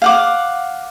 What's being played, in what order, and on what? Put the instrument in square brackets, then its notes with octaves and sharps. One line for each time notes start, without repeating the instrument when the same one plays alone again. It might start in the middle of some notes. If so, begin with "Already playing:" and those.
[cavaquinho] F5 F#5 D6